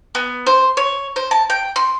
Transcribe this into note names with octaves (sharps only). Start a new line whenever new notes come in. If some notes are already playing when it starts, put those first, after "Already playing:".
B3
C5
C#5
C5
A5
G5
C6